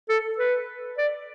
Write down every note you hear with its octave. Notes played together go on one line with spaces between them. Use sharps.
A4
B4
D5